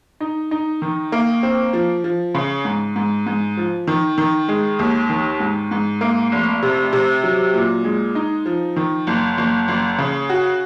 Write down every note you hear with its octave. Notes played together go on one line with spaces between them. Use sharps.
D#4
D#4
D#3
A#3
C4
F3
F3
C#3
G#2
G#2
G#2
F3
D#3
D#3
G#3
D#2
D#3
G#2
G#2
A#3
F1
C3
C3
F#3
A#2
G#3
D#4
F3
D#3
F#1
F#1
F#1
C#3
F#4